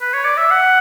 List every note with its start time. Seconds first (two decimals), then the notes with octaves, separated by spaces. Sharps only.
0.01 B4
0.14 C#5
0.25 D5
0.37 E5
0.51 F#5